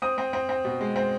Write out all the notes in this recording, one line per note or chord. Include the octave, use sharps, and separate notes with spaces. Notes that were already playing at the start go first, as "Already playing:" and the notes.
C4 D#6
C4
C4
C4
B2
G#3
C4